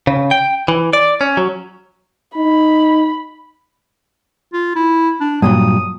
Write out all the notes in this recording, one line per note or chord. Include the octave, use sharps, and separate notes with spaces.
C#3
G5
E3
D5
C#4
F#3
D#4 B5
F4
E4
D4
G2 A#2 F#3 D#6